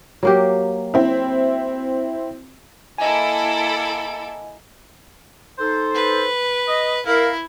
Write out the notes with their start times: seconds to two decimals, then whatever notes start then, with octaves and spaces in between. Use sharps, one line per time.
0.23 F#3 A#3 G4
0.94 C4 E4
2.98 A#3 E4 A4 D#5 G#5
5.59 D#4 A4 C5
5.94 B4
6.68 D#5
7.06 E4 A#4 F5